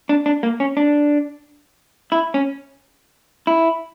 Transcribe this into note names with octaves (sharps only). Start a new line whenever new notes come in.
D4
D4
A#3
C#4
D4
E4
C#4
E4